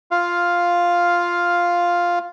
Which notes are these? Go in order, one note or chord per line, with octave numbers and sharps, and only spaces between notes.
F4 F5